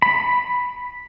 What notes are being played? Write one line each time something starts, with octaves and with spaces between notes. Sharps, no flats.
B5